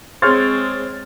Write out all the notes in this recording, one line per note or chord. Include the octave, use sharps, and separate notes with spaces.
G#3 C4 G#4 C5 C#5 F6 A6